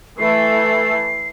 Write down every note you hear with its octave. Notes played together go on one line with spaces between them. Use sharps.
E3 A3 A4 C7